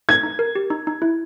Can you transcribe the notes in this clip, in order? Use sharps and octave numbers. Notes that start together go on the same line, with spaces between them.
D#4 G#6
D#4
A#4
G4
D#4
D#4
E4